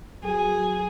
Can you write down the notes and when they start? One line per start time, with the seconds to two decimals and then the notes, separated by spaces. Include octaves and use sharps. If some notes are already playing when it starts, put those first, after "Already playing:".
0.24 F#3 G#4